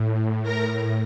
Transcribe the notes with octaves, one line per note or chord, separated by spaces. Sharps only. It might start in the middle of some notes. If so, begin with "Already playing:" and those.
Already playing: A2
A#4 A#5